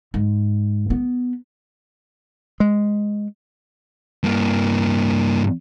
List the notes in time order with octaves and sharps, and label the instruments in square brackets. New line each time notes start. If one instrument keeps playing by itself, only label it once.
[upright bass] G#2
B3
[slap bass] G#3
[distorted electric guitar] G2 A#3